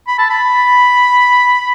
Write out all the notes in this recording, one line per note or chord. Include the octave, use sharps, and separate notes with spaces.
B5
A5
B5